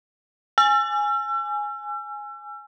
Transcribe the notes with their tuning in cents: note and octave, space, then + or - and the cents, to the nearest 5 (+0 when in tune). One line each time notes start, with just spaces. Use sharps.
G#5 +0 E6 +40